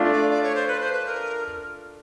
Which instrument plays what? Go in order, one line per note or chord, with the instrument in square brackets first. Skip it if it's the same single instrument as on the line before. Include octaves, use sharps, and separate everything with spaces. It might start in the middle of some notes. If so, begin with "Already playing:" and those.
Already playing: [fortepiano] A3 D4 F4
[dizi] D5
D5
C#5
C5
B4
C5
B4
A#4